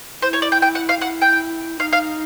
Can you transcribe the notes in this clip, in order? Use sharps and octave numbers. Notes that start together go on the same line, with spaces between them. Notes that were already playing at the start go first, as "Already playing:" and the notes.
E4 C5
C#5
D5
G5
G5
F#5
F5
E4 F#5
G5
D#4 F5
F5